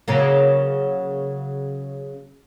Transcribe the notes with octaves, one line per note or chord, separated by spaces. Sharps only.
C#3 F#3 A#3